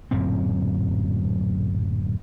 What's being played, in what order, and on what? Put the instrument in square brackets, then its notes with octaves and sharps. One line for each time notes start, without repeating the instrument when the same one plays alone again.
[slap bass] D1 F#2 A#2 C4